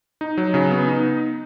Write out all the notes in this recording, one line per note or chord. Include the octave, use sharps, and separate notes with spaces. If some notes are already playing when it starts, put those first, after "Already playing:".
D#4
F#3
C#3
B3
D#4